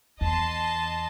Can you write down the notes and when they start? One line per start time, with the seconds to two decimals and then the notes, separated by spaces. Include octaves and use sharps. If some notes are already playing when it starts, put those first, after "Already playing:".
0.21 E2 D#5 A5 C6